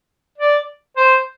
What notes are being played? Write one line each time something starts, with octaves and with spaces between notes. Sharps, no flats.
D5
C5